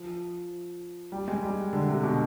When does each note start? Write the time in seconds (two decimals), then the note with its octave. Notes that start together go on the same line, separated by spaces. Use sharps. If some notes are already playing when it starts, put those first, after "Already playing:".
Already playing: F3
1.12 G3
1.28 G#3
1.43 G3
1.73 D3
1.88 C3
2.03 B2